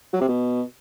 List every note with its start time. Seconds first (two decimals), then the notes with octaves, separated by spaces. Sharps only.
0.13 F#3
0.21 C3
0.29 B2